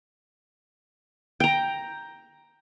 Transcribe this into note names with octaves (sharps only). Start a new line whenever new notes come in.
G5 A#5